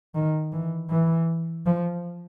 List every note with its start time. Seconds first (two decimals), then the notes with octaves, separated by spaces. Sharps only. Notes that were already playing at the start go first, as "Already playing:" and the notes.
0.15 D#3
0.52 E3
0.90 E3
1.66 F3